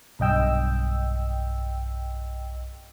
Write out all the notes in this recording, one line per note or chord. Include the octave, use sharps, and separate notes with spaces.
B1 G2 D#5 G5 E6